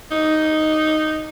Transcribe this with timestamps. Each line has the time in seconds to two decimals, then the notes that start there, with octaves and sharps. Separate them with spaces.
0.11 D#4